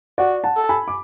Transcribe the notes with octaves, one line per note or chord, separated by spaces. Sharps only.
F#4 D5 F#5
F#5 A5
A4
G#5 B5
D6